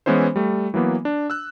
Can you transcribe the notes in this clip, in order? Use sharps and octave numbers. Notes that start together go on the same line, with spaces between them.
E3 G#3 B3 C#4 E4 C5
G3 A3
E3 F#3 A#3 B3
D4
E6 F#6